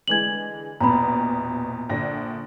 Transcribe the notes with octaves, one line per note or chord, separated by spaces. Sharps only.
D3 E3 G#3 G#6 F#7
A#1 E2 B2 A#5 B5
A#1 D3 A#6